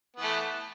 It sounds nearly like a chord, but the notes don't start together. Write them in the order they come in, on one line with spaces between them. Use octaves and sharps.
B3 E3 A3